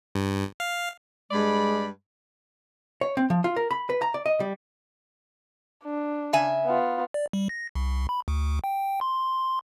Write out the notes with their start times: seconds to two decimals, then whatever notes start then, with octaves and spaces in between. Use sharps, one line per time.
0.15 G2
0.60 F5
1.30 G2 G#3 D5 B5
3.01 C#5
3.17 C4
3.30 F3
3.44 F4
3.56 A#4
3.71 B5
3.90 B4
4.02 A#5
4.14 D5
4.26 D#5
4.40 G3
5.84 D4
6.33 C#3 E5 G#5
6.65 B3 F4
7.14 D5
7.33 G3
7.49 A#6
7.75 C2
8.09 B5
8.28 D2
8.64 G5
9.01 C6